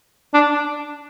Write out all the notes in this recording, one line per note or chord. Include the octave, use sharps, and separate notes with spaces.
D4